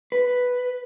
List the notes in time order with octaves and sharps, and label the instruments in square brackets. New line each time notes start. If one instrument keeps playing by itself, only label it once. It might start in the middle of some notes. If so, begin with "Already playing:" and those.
[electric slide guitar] B4